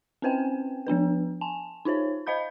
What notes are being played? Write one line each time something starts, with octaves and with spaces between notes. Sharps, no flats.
C4 C#4 B4 C5 G5 G#5
F3 B3 D4 B4
G#5 A5
D#4 F4 C5 C#5
C5 D#5 F5 B5 G6